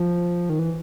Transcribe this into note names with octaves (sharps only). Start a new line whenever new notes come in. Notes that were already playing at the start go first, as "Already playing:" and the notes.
Already playing: F3
D#3
E3